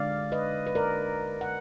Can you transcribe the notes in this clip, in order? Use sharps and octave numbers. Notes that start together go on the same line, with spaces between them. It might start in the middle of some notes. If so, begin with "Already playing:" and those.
Already playing: D3 G#3 D4 D5 F5
B4 D#5
B4
A#4 D5
F#5